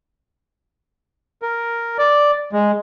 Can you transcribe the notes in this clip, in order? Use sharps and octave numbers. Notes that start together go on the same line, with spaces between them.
A#4
D5
G#3